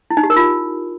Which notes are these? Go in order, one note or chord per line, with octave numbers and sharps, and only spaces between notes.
E4
D#4
G4
A#4
F4